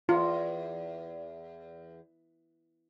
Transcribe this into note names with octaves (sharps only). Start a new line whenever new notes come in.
E2 F4